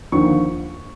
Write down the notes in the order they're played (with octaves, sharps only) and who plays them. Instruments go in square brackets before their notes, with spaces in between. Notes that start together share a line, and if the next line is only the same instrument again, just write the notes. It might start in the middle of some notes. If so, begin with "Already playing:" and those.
[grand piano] D#2 D3 F3 C#6